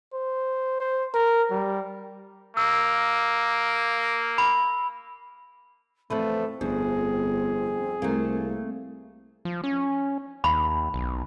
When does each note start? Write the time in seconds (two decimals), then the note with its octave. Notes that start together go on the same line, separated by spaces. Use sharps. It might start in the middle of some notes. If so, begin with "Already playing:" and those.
0.13 C5
0.80 C5
1.14 A#4
1.50 G3
2.57 A#3 E6
4.38 B5
6.10 E2 F3 A3 C4 B4
6.61 G1 F2 G#4
8.02 C2 A3 A#3
9.45 F3
9.64 C#4
10.44 D#2 B5
10.94 B1